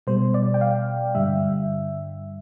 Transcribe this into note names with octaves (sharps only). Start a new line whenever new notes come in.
B2 G3 C5
D5
G5
F5
G2 D3 G3 E5